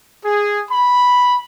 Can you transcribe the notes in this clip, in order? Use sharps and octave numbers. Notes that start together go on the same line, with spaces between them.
G#4
B5